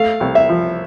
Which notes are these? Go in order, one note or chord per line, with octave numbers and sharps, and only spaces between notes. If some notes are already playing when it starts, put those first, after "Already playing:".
Already playing: A3 F5
C2
E5
F3